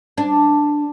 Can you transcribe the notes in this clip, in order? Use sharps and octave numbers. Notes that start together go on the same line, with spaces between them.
D4